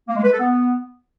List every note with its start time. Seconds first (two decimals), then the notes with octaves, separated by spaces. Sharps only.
0.08 A#3
0.16 G#3
0.24 B4
0.32 A4
0.40 B3